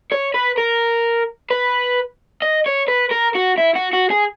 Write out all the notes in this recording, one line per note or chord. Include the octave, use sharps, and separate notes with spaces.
C#5
B4
A#4
B4
D#5
C#5
B4
A#4
F#4
E4
F#4
F#4
G#4